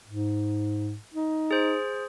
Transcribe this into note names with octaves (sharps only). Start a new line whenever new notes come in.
G#2
D#4
G#4 C5